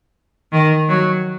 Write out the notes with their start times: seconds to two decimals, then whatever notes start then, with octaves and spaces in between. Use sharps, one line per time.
0.52 D#3
0.89 F#3